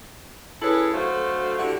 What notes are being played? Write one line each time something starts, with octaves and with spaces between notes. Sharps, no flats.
C#4 E4 G#4 A4 B4 C#5
D3 F#3 A3 F#4 C5 F5
D3 G3 E4 F#4